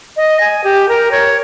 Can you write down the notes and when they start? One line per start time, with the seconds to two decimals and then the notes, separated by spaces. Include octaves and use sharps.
0.17 D#5
0.40 G#5
0.64 G4
0.89 A#4
1.11 C#5